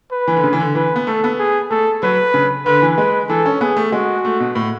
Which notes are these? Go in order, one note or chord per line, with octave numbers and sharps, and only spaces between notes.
B4
E3
D3
C#3
E3
D3
E3 B4
B3
A3 A4
B3
G#4
A3 A4
F#3 B4
C#3
D3 B4
E3
G#3 B4
E3 A4
C#4
B3 G#4
A3
G#3 F#4
A3
B2
A2